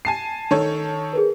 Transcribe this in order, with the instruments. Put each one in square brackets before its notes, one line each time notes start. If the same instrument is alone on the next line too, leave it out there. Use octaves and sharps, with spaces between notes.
[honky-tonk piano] G#5 A5 C7
D#3 A4 C#5
[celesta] G#4 A#4 B4